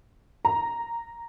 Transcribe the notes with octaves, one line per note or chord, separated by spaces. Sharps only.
A#5